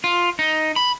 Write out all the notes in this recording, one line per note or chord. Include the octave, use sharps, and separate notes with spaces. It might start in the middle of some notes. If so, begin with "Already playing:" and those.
F4
D#4
B5